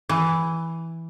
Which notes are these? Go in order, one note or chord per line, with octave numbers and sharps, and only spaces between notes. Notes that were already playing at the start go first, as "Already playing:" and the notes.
E3